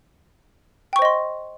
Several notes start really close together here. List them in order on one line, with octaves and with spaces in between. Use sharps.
G5 C#6 C5 D#5 C6